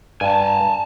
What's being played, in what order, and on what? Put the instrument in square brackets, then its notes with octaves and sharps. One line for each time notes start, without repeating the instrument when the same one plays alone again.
[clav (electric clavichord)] G2 [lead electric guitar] G#5 A5